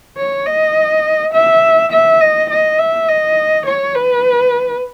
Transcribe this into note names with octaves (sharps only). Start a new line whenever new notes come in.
C#5
D#5
E5
E5
D#5
D#5
E5
D#5
C#5
B4